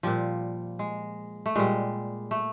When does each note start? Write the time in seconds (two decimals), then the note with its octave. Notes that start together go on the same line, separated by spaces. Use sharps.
0.03 A#2 F3 G3
0.79 G#3
1.46 A3
1.55 A#2 G3 G#3
2.31 A3